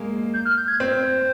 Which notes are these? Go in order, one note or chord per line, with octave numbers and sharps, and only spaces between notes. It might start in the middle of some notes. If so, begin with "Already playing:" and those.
Already playing: G#3 A#3
G6
F6
G6
G#6
C4 G6